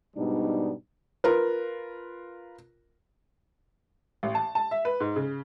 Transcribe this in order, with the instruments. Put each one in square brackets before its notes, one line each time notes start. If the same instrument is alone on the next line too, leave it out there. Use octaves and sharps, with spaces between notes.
[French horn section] G#2 B2 G3 D4 D#4
[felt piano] F4 A#4 B4
[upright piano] A1
A5
A5
E5
B4
G#2
C#3